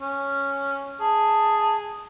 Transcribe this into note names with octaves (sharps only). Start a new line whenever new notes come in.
C#4
G#4 A5